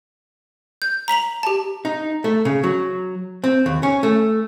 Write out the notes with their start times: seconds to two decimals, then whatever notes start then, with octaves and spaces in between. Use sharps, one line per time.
0.82 G6
1.08 A#5 B6 F7 F#7
1.43 G4 A5
1.85 D#4
2.24 A3
2.45 C#3
2.63 F#3
3.44 C4
3.66 D#2
3.83 C#4
4.03 A3